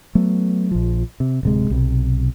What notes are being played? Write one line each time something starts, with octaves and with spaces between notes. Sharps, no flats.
F#3 A3 B3
A#1 F3
C3
D1 C3 G#3
B1 C3